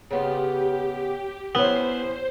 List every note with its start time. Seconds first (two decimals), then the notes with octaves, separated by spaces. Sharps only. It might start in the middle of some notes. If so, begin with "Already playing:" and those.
0.11 C#3 B3 F4 G4
1.55 B3 C#4 E4 C5